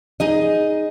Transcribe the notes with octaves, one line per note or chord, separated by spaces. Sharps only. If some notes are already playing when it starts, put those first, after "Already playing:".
D#4 G#4 D#5